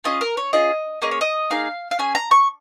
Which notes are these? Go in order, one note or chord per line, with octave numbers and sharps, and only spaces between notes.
C#4 F4 G#4 D#5
A#4
C#5
C#4 F4 G#4 D#5
A#3 C#4 G#4 D#5
C#5
D#5
A#3 D#4 G#4 F5
F5
C#4 G#4 G#5
A#5
C#6